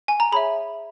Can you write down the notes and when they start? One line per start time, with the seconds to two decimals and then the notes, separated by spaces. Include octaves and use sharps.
0.08 G#5
0.20 A#5
0.32 G#4 C#5 E5 B5